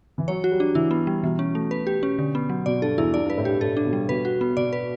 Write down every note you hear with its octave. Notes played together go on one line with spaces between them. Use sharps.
E3
F#3 C#5
F#4
G3
D4
E3 E4
B3
G3
B2 E3
C#4
A3
B4
G4
C#4
D3
B3
F#3
B2 D5
G2 A4
E2 E4
G2 D5
G2 B4
A2
G2 G4
A2 A4
D4
B2
G3
B2 B4
F#4
B3
B2 D5
B4